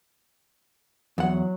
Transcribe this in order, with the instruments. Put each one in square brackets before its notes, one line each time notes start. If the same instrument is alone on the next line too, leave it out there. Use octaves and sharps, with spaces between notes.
[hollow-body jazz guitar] E2 F#5 [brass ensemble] F#3